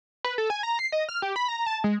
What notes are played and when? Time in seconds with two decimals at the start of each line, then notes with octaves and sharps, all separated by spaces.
0.24 B4
0.38 A4
0.50 G#5
0.63 A#5
0.79 C7
0.92 D#5
1.09 F6
1.22 G4
1.36 B5
1.48 A#5
1.66 A5
1.84 G#3